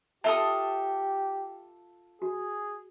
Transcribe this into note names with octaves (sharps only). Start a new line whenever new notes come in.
F4 G4 A4 E5 A5 D#6
F#4 G#4